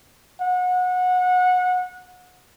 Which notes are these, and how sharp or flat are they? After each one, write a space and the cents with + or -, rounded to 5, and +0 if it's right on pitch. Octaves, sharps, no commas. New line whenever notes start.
F#5 -25